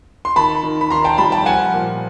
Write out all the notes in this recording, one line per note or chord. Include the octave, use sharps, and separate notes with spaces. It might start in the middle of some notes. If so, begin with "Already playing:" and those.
C6
D#3 A5 B5
D#3
B5
D#3 A#5 C6
G5 A5
G3 A5 B5
G5 A5
F3 F#5 G#5
A#2